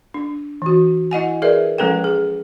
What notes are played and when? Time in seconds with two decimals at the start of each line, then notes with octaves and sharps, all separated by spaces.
0.14 D4
0.62 E3 F#4
1.11 E4 D#5 F#5 G#5
1.42 G#4 A#4 B4 D5 E5
1.78 F3 G#3 C#4 A4 B4 G5
2.04 G#4